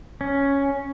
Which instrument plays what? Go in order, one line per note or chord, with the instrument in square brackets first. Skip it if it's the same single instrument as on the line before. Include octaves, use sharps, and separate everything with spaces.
[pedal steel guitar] C#4